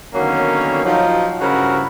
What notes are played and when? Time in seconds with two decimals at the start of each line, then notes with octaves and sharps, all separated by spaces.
0.14 D3 D#3 F#3 A#3 B3 C#4
0.85 F3 F#3 D#4
1.41 G2 C#3 F3 E4 F#4 A#4